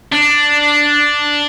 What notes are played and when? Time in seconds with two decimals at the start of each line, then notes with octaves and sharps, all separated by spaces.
0.12 D4